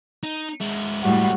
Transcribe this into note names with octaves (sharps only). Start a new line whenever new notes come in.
D#4
G#3 E4
A2 G3 F#4